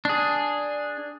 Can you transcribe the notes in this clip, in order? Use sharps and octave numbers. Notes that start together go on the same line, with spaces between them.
D4 G#4